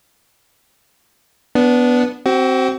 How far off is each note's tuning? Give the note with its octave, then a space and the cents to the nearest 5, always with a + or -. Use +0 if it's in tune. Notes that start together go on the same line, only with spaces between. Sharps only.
B3 +0 D4 -20
C4 +0 F#4 +35